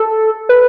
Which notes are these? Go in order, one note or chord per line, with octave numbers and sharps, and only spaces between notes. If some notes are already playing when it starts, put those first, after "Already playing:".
Already playing: A4
B4